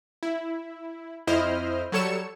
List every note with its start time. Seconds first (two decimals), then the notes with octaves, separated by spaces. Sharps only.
0.23 E4
1.27 F2 E4 C5 D#5 F6
1.92 F#3 G3 A4 C#5 C#7 E7